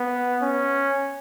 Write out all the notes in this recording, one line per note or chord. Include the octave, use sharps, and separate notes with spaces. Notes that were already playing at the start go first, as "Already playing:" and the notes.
Already playing: B3
C#4